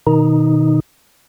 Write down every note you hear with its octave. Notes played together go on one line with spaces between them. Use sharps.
B2 D#3 D#4